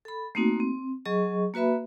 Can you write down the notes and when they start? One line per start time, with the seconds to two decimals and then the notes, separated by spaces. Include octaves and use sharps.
0.05 A4 B5
0.35 A3 A#3 C4 D#4 F#4
0.60 C4
1.05 F#3 G#4 D#5 C#6
1.54 A#3 F#4 B4 E5 B5